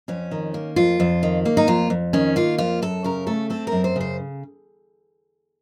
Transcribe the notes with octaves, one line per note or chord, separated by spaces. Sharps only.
F2 C#4
D#3
A#3
F2 F4
F2
D#3
A#3
D#4
F2 F4
F2
D#3 C#4
A#3 F4
F2 F4
F#2 A4
C#3 A#4
A3 A4
C4 A4
A#4
F#2
C5
C#3 C5